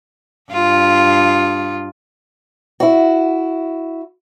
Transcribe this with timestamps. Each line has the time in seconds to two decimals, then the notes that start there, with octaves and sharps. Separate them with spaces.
0.52 G2 F4
2.80 E4 F#4